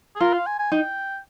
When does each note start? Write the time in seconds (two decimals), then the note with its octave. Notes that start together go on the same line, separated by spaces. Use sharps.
0.16 G#4
0.20 F4 A#4
0.33 F5
0.46 G#5
0.59 G#5
0.72 D#4 G5